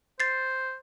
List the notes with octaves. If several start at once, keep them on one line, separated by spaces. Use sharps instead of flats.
C5 A6 C7